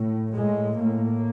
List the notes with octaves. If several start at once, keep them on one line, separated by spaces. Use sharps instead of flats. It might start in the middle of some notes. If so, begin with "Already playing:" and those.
Already playing: A2
A2 G#3
A2 A#3